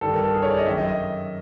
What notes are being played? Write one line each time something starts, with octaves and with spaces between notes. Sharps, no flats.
G2 D#3 A4
A#4
A4
G#4
C#5
D5
D#5
F#2 D#3 E5
D#5
D#5